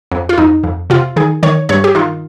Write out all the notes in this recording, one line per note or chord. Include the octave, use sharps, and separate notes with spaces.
F2
F4
F2 D#4
F2
C3 F4
D#3 G#4
D#3 C#5
G2 C#5
G4
D#3 F4